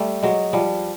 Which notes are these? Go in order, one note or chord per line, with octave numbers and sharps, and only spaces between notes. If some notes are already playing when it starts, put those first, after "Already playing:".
Already playing: G3 A3
F#3 G#3
F3 G3